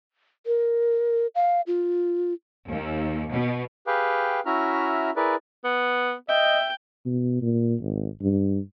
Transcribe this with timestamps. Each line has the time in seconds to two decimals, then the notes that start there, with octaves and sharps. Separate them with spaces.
0.46 A#4
1.35 F5
1.67 F4
2.70 D#2
3.32 B2
3.87 G4 G#4 B4 F5 G5
4.46 C#4 E4 F#4 E5 A#5 F6
5.16 E4 G#4 A#4 B4 D5
5.64 B3
6.29 D#5 E5 G5
7.05 B2
7.42 A#2
7.81 G#1
8.21 G2